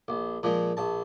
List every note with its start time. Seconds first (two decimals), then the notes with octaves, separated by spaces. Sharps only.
0.08 A#1
0.43 A#2 F3 G#3
0.77 A#1 A5